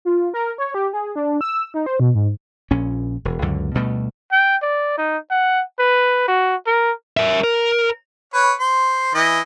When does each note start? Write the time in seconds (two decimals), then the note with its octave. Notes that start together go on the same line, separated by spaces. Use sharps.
0.05 F4
0.34 A#4
0.58 C#5
0.74 G4
0.93 G#4
1.16 D4
1.41 E6
1.74 D#4
1.86 C5
2.00 B2
2.15 G#2
2.71 A#1 A#2 C#4
3.25 E1
3.42 C#2 F#2 D3
3.75 D2 B2 G3 A3
4.32 G5
4.62 D5
4.98 D#4
5.31 F#5
5.79 B4
6.28 F#4
6.67 A#4
7.17 A#4 E5
7.44 A#4
8.34 B4 C#5
8.60 C5
9.14 E3 D#5